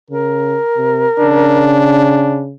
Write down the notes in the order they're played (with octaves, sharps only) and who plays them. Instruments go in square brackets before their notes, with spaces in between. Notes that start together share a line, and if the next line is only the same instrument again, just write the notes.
[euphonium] C#3 [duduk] A#4
[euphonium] C3
[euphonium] C#3 [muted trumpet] D4